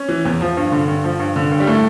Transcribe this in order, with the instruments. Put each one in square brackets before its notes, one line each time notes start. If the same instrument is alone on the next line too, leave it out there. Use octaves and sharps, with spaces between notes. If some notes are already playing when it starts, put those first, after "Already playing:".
Already playing: [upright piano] C#4
E3
E2
F3
G2
D3
G2
F3
G2
D3
G2
G3
A2 A3